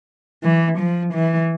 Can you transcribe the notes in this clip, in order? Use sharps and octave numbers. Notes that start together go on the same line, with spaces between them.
E3
F3
E3